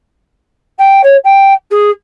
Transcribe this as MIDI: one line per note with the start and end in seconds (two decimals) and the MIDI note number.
0.78 1.01 79
1.03 1.16 73
1.24 1.53 79
1.70 1.90 68